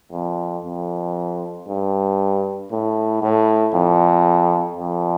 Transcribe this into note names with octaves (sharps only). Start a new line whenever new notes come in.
F2
F2
G2
A2
A2
F2
F2